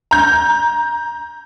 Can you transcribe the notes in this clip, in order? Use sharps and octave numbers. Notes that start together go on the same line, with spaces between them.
A#5 G6